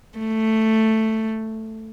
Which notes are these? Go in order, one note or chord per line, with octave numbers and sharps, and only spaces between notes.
A3